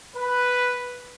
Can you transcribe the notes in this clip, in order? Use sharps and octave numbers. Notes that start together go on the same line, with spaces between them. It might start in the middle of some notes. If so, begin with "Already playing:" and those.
B4